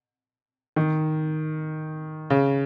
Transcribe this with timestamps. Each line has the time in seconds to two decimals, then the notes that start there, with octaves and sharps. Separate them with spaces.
0.76 D#3
2.30 C#3